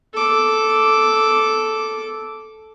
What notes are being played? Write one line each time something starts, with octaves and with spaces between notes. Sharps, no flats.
A4 D6